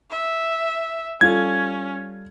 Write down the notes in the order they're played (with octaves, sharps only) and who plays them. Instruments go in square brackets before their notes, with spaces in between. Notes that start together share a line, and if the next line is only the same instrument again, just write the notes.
[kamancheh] E5
[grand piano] G3 F4 A4 [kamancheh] C#4 [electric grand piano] G#6